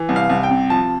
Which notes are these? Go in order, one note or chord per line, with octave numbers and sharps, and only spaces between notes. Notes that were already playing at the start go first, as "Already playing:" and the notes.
Already playing: E3
C2
F5
C2
G5
C3
F3 A5